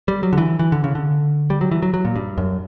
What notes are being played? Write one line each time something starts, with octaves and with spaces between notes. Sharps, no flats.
G3
F#3
D3
E3
E3
D3
C#3
D3
G3
F#3
E3
F#3
F#3
A#2
G2
F#2